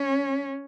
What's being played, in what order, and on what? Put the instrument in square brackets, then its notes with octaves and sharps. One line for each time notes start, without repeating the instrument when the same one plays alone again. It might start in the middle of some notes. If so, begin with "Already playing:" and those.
Already playing: [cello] C#4